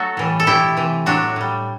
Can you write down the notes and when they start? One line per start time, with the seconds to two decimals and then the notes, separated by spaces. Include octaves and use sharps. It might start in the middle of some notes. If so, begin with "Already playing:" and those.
Already playing: F#3 A3 F#4 A4
0.17 A2 E3 G3
0.40 A4
0.46 B2 A3 E4 G4
0.77 C3 E3 A3
1.06 A2 F#3 A3 D4 F#4
1.36 A2 G3